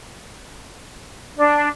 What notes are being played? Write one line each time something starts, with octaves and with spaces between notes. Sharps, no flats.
D4